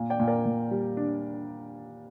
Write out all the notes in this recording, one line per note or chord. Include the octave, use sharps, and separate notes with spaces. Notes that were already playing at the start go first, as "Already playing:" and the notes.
Already playing: A#2
D5 G5
A#2
A#4 D5
A#2
G3
D4